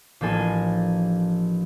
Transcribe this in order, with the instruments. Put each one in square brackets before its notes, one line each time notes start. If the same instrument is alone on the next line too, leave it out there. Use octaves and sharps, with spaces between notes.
[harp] A1 F3 A#3 D4 A4 G#5